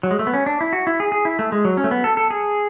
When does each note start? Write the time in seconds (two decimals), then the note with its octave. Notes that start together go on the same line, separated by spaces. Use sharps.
0.03 F#3
0.11 G#3
0.19 A3
0.27 B3
0.34 C#4
0.46 D4
0.61 E4
0.73 F#4
0.87 E4
1.00 G#4
1.12 G#4
1.25 E4
1.39 A3
1.52 G#3
1.65 F#3
1.77 C#4
1.84 A3
1.91 B3
2.04 A4
2.17 A4
2.30 G#4